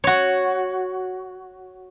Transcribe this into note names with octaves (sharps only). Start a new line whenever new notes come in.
F#4 C#5